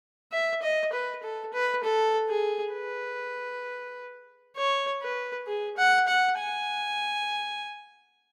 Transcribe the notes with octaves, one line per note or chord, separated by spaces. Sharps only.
E5
D#5
B4
A4
B4
A4
G#4
B4
C#5
B4
G#4
F#5
F#5
G#5